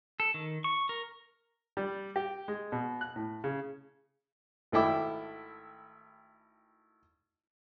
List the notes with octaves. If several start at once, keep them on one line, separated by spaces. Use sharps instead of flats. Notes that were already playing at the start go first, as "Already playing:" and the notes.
A4
D#3
C#6
A#4
G3
G4
G#3
B2
F#6
A2
C#3
G#1 A3 E4 G5 D6